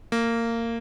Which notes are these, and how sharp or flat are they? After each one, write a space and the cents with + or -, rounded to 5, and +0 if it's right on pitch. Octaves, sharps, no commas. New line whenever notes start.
A#3 -20